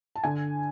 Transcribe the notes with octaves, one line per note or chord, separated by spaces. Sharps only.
A5
D3 G#5